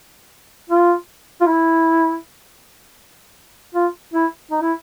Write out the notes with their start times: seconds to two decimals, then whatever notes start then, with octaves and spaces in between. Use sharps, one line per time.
0.70 F4
1.41 F4
1.46 E4
3.75 F4
4.14 E4
4.51 D#4
4.61 E4